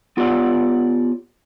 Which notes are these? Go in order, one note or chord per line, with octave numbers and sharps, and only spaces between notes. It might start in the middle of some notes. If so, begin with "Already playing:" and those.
B3 F4 G4 C#5 D5 F#5